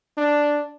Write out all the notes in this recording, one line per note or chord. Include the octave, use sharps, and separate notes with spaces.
D4